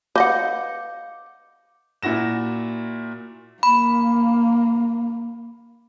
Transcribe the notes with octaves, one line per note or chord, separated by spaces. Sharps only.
B4 D#5 F5 F#5 D6 G6
A#2 E4 F#4 A#6 E7
A#3 B5